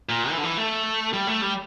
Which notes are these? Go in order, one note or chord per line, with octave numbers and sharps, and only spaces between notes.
A#2
E3
D3
E3
A3
G3
A3
G3